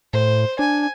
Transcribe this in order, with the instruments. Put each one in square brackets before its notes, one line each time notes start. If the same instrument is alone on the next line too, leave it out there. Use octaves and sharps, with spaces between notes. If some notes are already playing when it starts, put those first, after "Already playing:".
[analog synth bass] A2 [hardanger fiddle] C5
[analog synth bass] D4 [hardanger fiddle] G#5